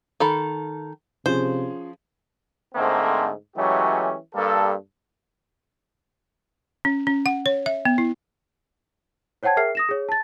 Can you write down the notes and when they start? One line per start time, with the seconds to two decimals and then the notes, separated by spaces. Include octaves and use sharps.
0.20 D#3 A4 B5
1.26 C3 F3 C#4 G#4 C5
2.75 G#2 D3 A3 A#3 C4
3.57 E3 F#3 G#3 A3 C#4 G4
4.35 G2 G3 A#3 A4
6.85 C#4
7.07 C#4
7.26 F#5
7.46 C#5
7.66 E5
7.85 B3
7.98 E4
9.43 C5 C#5 F#5 G5 A5 G#6
9.57 G#4 A#4 E5 G5 F6 C7
9.75 D#6 A#6 E7
9.89 G#4 C#5
10.09 A5 A6